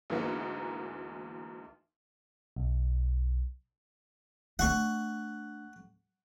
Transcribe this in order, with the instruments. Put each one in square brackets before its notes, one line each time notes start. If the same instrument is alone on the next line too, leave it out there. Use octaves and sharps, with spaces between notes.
[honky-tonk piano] D2 G#2 E3 A#3 B3 D#4
[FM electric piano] B1
[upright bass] A3 D4 [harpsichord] F#5 C#6